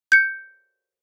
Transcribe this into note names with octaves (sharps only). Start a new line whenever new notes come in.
G6 C#7